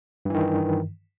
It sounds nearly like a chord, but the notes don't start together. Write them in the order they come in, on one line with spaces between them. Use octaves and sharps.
G2 E3 D#3